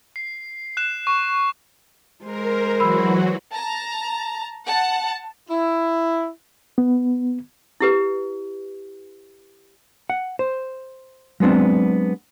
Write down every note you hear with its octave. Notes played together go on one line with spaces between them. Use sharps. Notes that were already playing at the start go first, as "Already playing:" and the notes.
C7
F#6 E7
C#6
G#3 A#4 C5
E3 F#3 F#4 A#4 B5 E6
A5 A#5
F#5 A5
E4
B3
E4 G4 B4
F#5
C5
F#3 G#3 B3 C4 D4